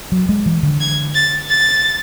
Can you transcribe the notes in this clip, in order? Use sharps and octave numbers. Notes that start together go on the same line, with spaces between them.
F#3
G#3
E3
D3
G#6
A6
A6